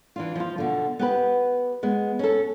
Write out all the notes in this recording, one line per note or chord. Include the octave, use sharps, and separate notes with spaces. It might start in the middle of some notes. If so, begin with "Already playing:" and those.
E3 D4 F4
F3 F4
B2 D3
B3 G4 B4
G#3 B3
C#4 A4